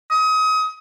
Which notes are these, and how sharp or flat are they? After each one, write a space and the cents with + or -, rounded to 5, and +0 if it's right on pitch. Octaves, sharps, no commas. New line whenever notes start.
D#6 +30